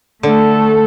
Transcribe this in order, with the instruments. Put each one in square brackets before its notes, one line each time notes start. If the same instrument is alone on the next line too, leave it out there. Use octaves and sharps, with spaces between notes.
[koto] D3 [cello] A3 A4